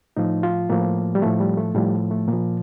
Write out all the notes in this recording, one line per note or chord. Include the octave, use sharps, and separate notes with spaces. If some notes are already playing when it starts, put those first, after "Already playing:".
A2 F3 D#4
F4
A2 F3 A#3
G3
A2 F3 A3
G3
A3
A2 F3 G3
A3
A#2 F3 A#3